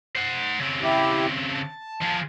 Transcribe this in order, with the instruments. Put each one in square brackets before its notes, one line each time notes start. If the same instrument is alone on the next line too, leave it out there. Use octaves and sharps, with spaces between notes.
[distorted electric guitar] C5 F#5
C#3 C4
[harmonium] E4 G4
A5
[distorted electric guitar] F3 G#4